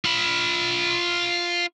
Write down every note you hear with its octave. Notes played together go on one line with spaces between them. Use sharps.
F4 B5